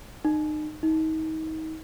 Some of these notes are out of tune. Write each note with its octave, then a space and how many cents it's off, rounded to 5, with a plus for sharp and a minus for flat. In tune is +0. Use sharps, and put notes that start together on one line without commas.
D#4 -35
D#4 +30